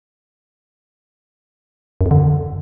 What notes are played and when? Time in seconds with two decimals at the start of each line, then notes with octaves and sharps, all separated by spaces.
2.01 F#2
2.06 F2
2.11 D3